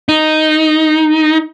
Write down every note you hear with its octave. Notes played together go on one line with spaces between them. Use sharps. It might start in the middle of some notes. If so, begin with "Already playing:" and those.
D#4